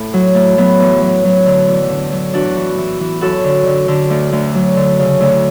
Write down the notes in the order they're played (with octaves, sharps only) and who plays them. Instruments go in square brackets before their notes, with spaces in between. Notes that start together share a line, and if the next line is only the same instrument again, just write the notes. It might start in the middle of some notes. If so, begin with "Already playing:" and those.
Already playing: [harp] A2 A3
F#3
A2
F#3 B3
E2
F#3
F#3
D3
E2
D3
F#3
E2 D4 F#4
E3
E3
E3
F#2 F#4 A4
D3
D3
D3
D2
D2
F#3
D3
C#3
D2